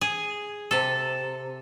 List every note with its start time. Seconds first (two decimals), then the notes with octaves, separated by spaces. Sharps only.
0.01 G#4
0.71 C3 A4